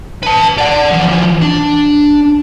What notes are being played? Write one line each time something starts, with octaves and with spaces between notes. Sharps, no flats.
B4 A5
D5 F#5
E3 F3
D4